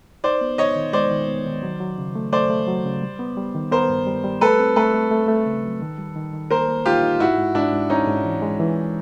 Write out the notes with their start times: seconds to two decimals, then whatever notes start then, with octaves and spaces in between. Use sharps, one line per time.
0.24 D#4 C5 D5
0.41 B3
0.58 D#4 C#5 D#5
0.76 D#3
0.93 G#3 C5 D5
1.11 D#3
1.28 B3
1.46 D#3
1.63 F#3
1.80 F#3
1.98 C#3
2.15 A3
2.33 A3 C5 D5
2.50 A3
2.67 F#3
2.85 C#3
3.02 G3
3.19 B3
3.37 G3
3.55 D#3
3.72 B3 A#4 C5
3.89 G2
4.07 G3
4.24 G3
4.41 A3 A4 B4
4.59 C4
4.76 A3 A4 B4
4.94 A3
5.11 A3
5.28 A3
5.46 C#3
5.63 F#3
5.81 D#3
5.98 G3
6.16 D#3
6.33 D#3
6.50 A#3 A#4 C5
6.68 A#3
6.86 D#4 F4 G4
7.03 D#4
7.20 G#2 E4 F#4
7.38 G#2
7.55 G#2 D4 E4
7.73 G#2
7.90 G#3 C#4 D#4
8.07 G#2
8.25 E3
8.42 G#3
8.60 E3